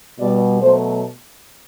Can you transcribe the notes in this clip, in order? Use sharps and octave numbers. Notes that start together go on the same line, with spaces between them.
B2 G3 D5
B2 F#3 A3 C5